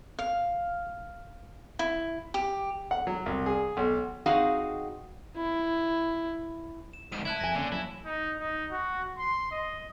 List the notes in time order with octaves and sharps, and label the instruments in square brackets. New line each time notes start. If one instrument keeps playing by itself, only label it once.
[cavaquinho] F5
E4
G4
[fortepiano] F#5
F#3
C2
G#4
B1
[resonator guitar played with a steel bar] C4 D#4 F#4 G#4 F5 F#5
[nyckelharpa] E4
[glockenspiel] E7
[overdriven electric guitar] C2 G#2 [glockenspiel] D#7
[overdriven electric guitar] E4 [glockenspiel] A5 F#6 G#6
[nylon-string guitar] F2 G#5 [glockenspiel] A#6 G7
[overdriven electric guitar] D3 [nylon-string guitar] A#3 C#4 [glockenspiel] G#5
[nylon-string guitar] F#3 [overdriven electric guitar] E4
[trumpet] D#4
D#4
F#4
C6
D#5